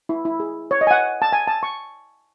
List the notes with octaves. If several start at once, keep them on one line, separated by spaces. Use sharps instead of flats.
E4
E4
G#4
C#5
D#5
G#5
F#5
A5
G#5
A5
C#6